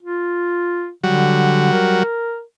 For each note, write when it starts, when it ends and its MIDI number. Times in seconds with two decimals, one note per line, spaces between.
0.02 0.91 65
1.04 1.70 50
1.04 2.03 54
1.04 2.03 55
1.04 2.03 66
1.72 2.42 70